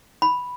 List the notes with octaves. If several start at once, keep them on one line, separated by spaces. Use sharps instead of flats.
B5